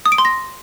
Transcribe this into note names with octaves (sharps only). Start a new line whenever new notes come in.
D#6
D7
C6
A#6